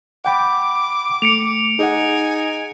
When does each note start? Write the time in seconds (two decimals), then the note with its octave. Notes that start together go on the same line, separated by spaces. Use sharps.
0.25 F#5 G5 B5 D6
1.22 A3 C#7 D7 F7
1.79 D#4 G#4 D#5 F#5 G#5